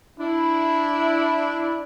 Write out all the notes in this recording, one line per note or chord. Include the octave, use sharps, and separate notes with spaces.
D4 E4